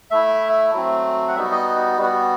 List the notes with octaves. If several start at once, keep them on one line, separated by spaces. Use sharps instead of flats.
A3 E4 E5
F#3 A3 C4
F#5
G3 B3 D#4 F#4 E5
D#5
G3 B3 F#4